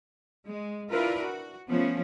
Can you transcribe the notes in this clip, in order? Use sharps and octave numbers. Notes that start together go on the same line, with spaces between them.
G#3
D4 E4 F4 A#4 B4
F#4
F3 A3 B3 C#4